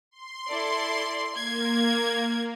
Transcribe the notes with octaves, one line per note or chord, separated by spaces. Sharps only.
C6
E4 A4 D5
A#3 G#6